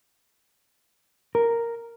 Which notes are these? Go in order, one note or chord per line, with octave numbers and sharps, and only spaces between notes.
A#4